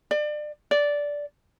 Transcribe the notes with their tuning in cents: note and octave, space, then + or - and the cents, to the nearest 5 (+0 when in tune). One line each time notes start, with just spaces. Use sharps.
D5 +30
D5 -10